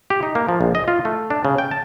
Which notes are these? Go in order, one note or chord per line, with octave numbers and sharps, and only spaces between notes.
G4
D#4
A#3
F3
A#1
D#5
F4
A3
D4
C#3
G5
A5